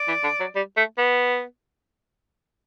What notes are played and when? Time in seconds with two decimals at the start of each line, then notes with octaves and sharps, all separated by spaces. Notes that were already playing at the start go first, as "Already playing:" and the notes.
Already playing: D5
0.08 E3
0.24 D3
0.40 F#3
0.55 G3
0.77 A3
0.98 B3